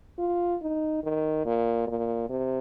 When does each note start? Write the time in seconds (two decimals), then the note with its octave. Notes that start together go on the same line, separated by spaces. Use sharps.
0.18 F4
0.62 D#4
1.03 D#3
1.45 A#2
1.87 A#2
2.29 C3